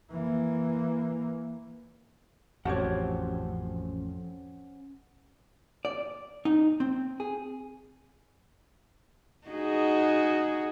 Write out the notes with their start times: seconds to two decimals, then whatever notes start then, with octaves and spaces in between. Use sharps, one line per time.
0.11 E3 A#3
2.65 A1 F2 C#4 F#4 G4 C5 C#5 F#5
5.85 D5
6.45 D#4
6.80 C4
7.20 G#4
9.48 D#4 F#4 G#4